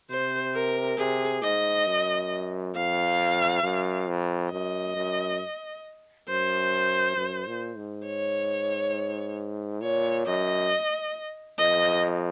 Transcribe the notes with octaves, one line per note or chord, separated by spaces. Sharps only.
C3 C5
A#4
C3 G#4
G#2 D#5
F#2
F2 F5
F#2
F2
F#2 D#5
F#2
F#2 C5
F#2
A#2
G#2
C#5
A#2 C#5
F#2 D#5
F2 D#5